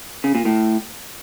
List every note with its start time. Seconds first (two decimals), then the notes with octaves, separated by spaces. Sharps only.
0.24 C#3
0.35 A#2
0.45 A2